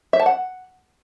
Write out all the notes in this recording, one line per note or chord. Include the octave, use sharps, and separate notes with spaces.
E5
A5
F#5